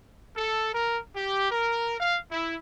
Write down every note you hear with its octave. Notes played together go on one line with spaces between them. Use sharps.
A4
A#4
G4
A#4
F5
E4